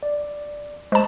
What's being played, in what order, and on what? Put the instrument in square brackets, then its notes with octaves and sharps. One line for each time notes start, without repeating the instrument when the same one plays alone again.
[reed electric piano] D5
[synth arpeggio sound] G#3 A5 [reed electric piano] C5